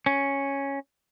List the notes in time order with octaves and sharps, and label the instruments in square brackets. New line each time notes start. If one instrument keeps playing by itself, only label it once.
[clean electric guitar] C#4